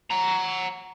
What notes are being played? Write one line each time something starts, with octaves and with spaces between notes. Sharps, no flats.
F#5 A#5